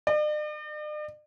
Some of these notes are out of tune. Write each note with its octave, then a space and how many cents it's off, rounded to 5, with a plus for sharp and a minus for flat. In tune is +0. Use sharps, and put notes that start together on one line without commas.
D5 +45